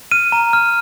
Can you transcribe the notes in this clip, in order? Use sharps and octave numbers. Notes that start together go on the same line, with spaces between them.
F6 D#7
A#5
F6